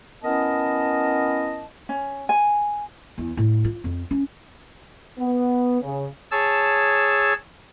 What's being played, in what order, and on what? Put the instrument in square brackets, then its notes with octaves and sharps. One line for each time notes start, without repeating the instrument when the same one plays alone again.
[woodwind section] B3 C#4 E4 A#4 D#5 A5
[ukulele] C#4
G#5
[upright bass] E2
A2
F4
F2
C#4
[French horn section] B3
C#3
[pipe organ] G#4 C#5 A5 E6